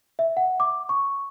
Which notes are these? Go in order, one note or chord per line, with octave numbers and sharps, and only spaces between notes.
E5
F#5
D6
C#6